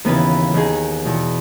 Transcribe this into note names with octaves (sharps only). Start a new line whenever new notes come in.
D#2 C#3 E3 B3 B4
D#2 D#3 G#4
E2 B2